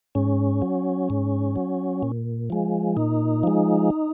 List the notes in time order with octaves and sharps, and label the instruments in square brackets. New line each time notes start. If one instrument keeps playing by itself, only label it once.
[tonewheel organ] G#2 C#4
F#3
G#2
F#3
A#2
F3 G#3
A#2 D#4
F3 G#3